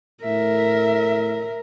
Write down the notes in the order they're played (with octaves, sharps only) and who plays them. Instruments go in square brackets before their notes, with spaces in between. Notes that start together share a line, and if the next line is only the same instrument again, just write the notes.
[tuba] A2 [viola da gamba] A#4 [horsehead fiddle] E5